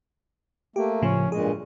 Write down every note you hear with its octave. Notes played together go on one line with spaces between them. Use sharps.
A3 A#3 G4
A2 C#3 F3 C#4
G2 A#2 G#3 G#4